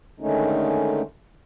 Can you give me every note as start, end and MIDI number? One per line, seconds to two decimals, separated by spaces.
0.20 1.02 50
0.20 1.02 51
0.20 1.02 56
0.20 1.02 57
0.20 1.02 61
0.20 1.02 63